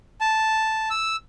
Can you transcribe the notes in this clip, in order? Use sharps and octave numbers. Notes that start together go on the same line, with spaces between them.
A5
E6